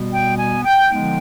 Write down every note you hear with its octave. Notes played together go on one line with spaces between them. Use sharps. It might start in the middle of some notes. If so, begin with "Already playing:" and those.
Already playing: B2 G3 B3
G5
G#5
G5
D3 F3 G#3 B3 D#4 G5